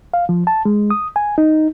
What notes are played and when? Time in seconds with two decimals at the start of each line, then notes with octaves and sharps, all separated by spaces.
0.14 F5
0.29 F3
0.47 A5
0.65 G#3
0.90 D#6
1.16 G#5
1.38 D#4